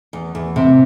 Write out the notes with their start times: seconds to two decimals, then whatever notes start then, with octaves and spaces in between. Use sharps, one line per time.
0.13 E2
0.35 E2
0.56 C3